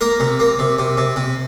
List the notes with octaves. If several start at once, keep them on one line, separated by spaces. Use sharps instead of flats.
A#3 A#4
C3
A#3
C3
C3
C3
C3